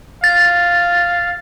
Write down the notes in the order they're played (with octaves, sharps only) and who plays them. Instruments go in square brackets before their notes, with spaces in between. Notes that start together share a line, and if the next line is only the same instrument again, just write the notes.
[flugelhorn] F5 [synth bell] A6